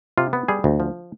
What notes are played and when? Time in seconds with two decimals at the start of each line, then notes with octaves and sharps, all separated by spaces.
0.18 C3 F4
0.33 B3
0.48 G3 G#4
0.64 D2
0.80 F3